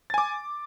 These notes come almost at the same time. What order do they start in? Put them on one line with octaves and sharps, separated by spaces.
A6 G#5 D6